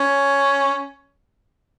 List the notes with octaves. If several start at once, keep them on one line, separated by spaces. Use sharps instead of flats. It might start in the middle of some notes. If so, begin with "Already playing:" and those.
Already playing: C#4